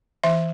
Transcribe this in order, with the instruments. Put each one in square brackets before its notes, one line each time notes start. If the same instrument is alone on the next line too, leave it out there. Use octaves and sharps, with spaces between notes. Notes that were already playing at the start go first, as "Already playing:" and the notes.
[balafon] E3 E5